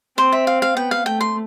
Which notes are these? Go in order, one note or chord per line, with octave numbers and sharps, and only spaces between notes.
C4 C5
E5
F5
F5
B3 G5
F5
A3 G5
C6